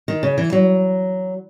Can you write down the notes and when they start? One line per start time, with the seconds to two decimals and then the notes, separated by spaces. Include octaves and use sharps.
0.08 D#3
0.23 C#3
0.38 E3
0.53 F#3